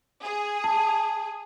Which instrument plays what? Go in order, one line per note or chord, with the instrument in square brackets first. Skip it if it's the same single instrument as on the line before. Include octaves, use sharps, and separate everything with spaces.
[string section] G#4
[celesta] A5